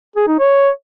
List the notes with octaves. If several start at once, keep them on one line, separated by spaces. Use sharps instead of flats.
G#4
D#4
C#5